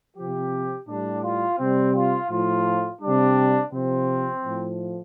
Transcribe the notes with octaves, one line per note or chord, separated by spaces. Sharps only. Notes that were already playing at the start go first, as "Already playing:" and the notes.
C3 F3 G4
A2 G3 D4
F4
C3 G3 C4
F4
A2 F3 F4
C3 G3 D4
C3 F3 C4
A2 F3